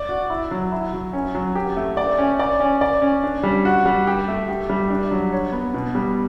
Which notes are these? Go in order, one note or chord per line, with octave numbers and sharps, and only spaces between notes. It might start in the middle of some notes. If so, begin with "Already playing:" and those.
Already playing: D5
F#4
E4
F#3
E4
F#3
C#4
F#3
G4
A3
D5
C#4
D5
C#4
D5
C#4
D4
G3
F#4
G3
G4
A3
G4
G3
D4
F#3
C#5
B3
B2
G3